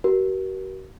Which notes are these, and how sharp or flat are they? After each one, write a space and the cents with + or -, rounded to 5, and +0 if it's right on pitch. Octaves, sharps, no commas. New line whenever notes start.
F#4 +45 A#4 +30